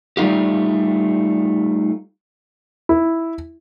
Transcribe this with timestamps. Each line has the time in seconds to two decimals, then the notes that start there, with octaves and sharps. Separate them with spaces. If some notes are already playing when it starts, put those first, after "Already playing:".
0.17 G3 A3 D#4 F4 G4
2.89 E4